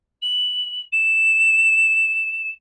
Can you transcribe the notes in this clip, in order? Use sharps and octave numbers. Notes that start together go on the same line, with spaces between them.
F#7
E7